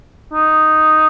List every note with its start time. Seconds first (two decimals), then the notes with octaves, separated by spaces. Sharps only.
0.33 D#4